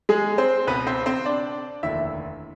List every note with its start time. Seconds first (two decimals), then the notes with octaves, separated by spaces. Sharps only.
0.09 G#3 G#4
0.38 C4 C5
0.67 C#2 B2 B3 B4
0.87 C4 C5
1.06 C4 C5
1.26 D4 D5
1.83 F1 D#2 D3 E4 E5